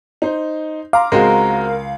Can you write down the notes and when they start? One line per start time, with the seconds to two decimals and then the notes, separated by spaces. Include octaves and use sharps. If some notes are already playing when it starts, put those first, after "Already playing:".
0.22 D#4 C5
0.93 F5 A#5 C6 D6
1.12 C#2 G#3 C4 F#4 A#4